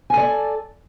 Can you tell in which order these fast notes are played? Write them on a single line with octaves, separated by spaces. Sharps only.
G#5 A4 D5